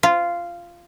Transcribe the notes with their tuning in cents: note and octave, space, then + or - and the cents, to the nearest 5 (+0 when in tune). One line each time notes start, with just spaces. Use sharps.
F4 -10